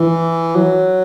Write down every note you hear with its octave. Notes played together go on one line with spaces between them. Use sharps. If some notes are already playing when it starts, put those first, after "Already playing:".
Already playing: E3
F#3